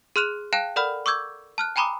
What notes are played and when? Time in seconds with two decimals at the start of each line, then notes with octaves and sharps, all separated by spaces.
0.16 G#4 C6 F6 F#6 E7 F7
0.53 F5 G5 A5 F#6 D7 E7
0.76 A4 A#4 D5 F#5 B5 F6
1.06 C#6 D6 E6 G6 G#6
1.58 A5 F6 F#6
1.76 G5 G#5 A#5 B5 D6 D#6